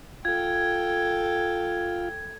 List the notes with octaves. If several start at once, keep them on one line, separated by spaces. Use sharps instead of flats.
F4 A4 G5 G#6